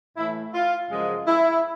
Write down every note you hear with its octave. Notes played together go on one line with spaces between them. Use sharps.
A2 E3 A3 E4
F4
F#2 C#3 F3 G#3
E4